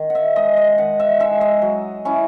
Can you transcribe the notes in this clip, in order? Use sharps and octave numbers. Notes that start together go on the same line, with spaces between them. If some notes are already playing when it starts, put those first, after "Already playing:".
Already playing: D#3
F#5
E5
G#3 D#4 D#5
D#5
D#3 F#5
E5
G#3 D#4 E5
D#5
F#3
C#4 E4